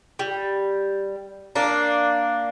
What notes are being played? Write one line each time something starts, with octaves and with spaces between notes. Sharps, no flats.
G3
A#3 D4